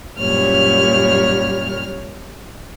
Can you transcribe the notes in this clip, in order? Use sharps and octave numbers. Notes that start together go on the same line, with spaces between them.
F#2 A#2 G3 C#5 F6